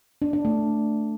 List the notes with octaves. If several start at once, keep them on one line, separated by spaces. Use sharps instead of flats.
D4
D4
A3